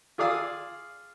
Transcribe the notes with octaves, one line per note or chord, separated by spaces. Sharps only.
F4 G#4 D5 F5 D#6 E6